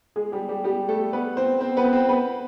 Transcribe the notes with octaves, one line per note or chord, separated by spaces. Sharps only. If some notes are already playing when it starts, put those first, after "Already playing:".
G#3 G#4
G3 G4
G3 G4
G3 G4
A3 A4
B3 B4
C4 C5
C4 C5
B3 B4
C4 C5
B3 B4